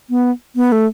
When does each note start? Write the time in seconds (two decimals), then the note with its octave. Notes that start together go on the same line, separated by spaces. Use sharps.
0.10 B3
0.56 B3
0.72 A3